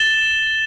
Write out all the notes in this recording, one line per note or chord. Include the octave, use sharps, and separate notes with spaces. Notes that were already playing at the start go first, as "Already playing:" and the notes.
Already playing: A6 E7 G7